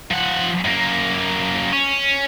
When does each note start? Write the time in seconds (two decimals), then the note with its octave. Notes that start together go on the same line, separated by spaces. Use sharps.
0.11 F3 F#5
0.65 F#2 A#3
1.72 C#4